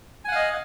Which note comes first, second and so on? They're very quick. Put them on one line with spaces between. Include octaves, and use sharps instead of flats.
G#5 F#5 F5 D#5